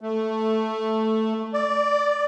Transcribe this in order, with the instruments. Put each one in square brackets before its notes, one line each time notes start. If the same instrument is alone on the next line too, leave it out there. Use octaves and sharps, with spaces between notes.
[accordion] A3
D5